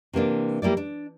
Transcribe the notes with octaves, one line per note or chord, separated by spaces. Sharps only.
C3 E3 A#3 D4
G3 A#3 E4 D5
D4